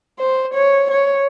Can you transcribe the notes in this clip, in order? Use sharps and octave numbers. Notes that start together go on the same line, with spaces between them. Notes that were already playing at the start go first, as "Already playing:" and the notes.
C5
C#5
C#5